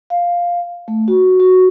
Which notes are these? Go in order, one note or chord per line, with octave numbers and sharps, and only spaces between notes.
F5
A3
F#4
F#4